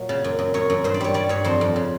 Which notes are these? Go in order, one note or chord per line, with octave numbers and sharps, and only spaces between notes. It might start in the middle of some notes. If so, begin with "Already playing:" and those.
Already playing: A#2 F#3
C#3
F#2
F#2
F#2 C#5
F#2
G2 C5
D5
G3 C#5
G3 D5
G2 C#5
F2 C5
F2
C#3